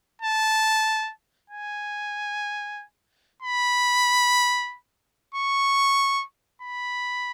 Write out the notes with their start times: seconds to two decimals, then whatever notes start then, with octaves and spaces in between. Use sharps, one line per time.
0.22 A5
1.50 G#5
3.42 B5
5.35 C#6
6.62 B5